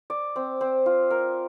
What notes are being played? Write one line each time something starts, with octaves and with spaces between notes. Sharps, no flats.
D5
C4
C4
F4
A#4